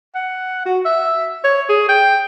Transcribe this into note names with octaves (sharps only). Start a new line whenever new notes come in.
F#5
F#4
E5
C#5
G#4
G5